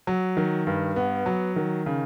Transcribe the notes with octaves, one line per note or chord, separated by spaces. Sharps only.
F#3
D#3
G2
B3
F#3
D#3
C#3